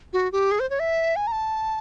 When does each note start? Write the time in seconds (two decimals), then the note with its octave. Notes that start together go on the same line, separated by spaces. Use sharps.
0.13 F#4
0.32 G4
0.51 G#4
0.60 C5
0.70 C#5
0.80 E5
1.16 G#5
1.27 A#5
1.32 A5